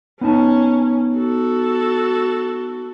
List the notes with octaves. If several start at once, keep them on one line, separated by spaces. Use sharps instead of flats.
B3 C#4 D#4 A5
F#4 A4